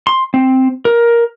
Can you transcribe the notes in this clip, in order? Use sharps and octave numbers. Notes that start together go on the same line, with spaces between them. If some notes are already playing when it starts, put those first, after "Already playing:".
C6
C4
A#4